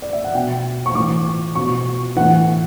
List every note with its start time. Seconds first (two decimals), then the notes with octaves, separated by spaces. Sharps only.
0.02 D5
0.13 E5
0.24 F#5
0.34 B2 G5
0.86 C#6
0.95 A2 E3 D6
1.55 B2 C#6
2.16 A2 E3 F#5